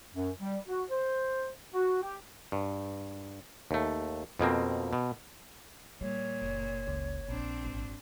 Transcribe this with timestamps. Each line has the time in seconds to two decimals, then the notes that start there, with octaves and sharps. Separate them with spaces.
0.14 F#2
0.40 G3
0.67 F#4
0.90 C5
1.74 F#4
2.02 G4
2.52 G2
3.71 D#2 A3
4.39 F2 B2 A#3 C4
4.93 B2
6.01 A#2 G3 C#5
6.41 F#1
6.88 C#2
7.29 A#1 C4 D4
7.65 G#1